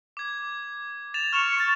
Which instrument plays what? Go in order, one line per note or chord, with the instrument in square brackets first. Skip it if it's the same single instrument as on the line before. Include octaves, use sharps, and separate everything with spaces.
[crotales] D6 G#6
A6 E7 F7
[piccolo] C#6 [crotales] F6 E7 F7
[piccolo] A6